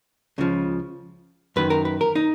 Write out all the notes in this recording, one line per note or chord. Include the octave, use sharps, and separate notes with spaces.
C#2 C#3 F3
F#2 D#3 B4
A#4
B4
A#4
D#4